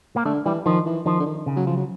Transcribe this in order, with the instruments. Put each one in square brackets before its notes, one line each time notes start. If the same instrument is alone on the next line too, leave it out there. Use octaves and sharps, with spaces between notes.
[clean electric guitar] A#3
[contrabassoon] D3 [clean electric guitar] A3
[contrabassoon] E3 [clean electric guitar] G3
[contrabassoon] D#3 [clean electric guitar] F3
[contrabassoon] E3
[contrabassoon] D#3 [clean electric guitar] F3
[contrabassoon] D3
D#3
[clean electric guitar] C#3
[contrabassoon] F#3
F3
F#3